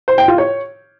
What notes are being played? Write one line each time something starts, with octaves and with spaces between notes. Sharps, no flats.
C5
G5
F4
C#5